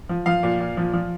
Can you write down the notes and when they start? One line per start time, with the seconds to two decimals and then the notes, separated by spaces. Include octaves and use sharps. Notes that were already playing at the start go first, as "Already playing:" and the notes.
0.09 F3
0.26 F3 F5
0.43 A#2
0.60 A#2
0.77 F3
0.93 F3